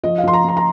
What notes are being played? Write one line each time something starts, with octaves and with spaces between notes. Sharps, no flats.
F3 D#5
F5
F3 C6
A#5
F3 A#5
A#5